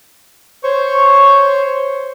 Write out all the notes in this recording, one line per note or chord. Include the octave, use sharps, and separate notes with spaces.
C5 C#5 C#6